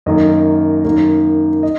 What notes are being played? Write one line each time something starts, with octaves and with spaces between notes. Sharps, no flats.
F#2 D#3 A#3 D#5
F#2 D#3 A#3
D#5